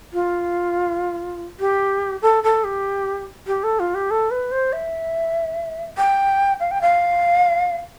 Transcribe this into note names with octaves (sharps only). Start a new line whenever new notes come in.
F4
G4
A4
A4
G4
G4
A4
F4
G4
A4
B4
C5
E5
G5
F5
G5
F5